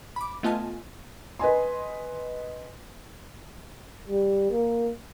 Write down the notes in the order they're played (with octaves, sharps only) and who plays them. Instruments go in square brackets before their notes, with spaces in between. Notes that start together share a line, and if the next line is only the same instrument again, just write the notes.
[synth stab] B5 D6
A3 B3 F4 D#5 G#5 A5
[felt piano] B4 D#5 G#5 C6
[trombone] G3
A#3